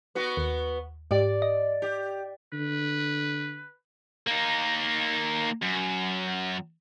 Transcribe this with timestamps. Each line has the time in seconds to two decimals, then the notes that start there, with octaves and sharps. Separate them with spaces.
0.15 B3 F#4 B4
0.37 D#2
1.11 G#2 G4 D5
1.42 D#5
1.82 G4
2.53 D3 B4
4.27 A#3 D#4
5.62 F#2